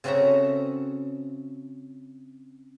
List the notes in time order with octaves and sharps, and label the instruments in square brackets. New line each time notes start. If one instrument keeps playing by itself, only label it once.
[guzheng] C#3 C4 F#4 A4 E5 A#5